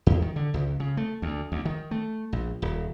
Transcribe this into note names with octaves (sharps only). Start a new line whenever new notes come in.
E2
D#3
D3
C#2
C#3
A3
D2
D2
D#3
A3
A#1
D#1